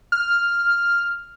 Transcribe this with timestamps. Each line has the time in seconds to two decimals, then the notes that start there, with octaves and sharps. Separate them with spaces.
0.12 F6